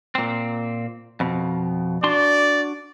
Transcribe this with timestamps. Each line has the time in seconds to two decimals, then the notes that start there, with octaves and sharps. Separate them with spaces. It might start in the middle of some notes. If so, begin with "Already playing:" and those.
0.15 A#2 C4
1.20 F2 B2
2.04 D4 F#4 D5 C6